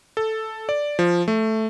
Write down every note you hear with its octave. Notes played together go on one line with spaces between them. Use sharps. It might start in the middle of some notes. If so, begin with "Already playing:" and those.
A4
D5
F3
A3